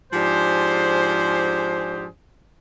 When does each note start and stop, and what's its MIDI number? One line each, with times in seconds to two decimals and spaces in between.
0.13 2.06 44
0.13 2.06 53
0.13 2.06 62
0.13 2.06 67
0.13 2.06 68
0.13 2.06 72